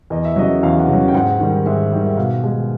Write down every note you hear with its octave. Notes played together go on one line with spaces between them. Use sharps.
E2 D#5
E5
C#3 F#3 D#5
E2 F5
F#5
C#3
F#3
G5
G#2 F#5
D#3 G3
G#2 E5
D#3 G3
E5
B2 F5
G#3